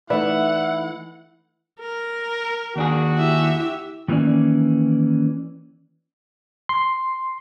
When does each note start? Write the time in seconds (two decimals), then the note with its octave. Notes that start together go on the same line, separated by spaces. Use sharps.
0.10 E3 A3 D#4 E4 B4 D5 E5 F#5
1.80 A#4
2.76 D#2 D4 F#4 G#4
3.18 E4 G4 E5
4.08 D#3 E3 A#3 C#4 D5
6.69 C6